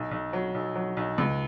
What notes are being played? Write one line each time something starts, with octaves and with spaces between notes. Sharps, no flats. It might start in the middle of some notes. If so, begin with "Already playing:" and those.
Already playing: B1
B1
F#3
B1
F#3
B1
C#2